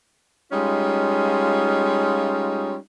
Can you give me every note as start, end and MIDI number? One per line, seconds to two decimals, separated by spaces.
0.52 2.77 55
0.52 2.77 56
0.52 2.77 61
0.52 2.77 63
0.52 2.77 65